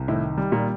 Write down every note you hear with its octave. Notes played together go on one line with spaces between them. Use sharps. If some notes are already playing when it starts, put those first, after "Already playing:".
Already playing: C2
A2 D#3
G3
A#2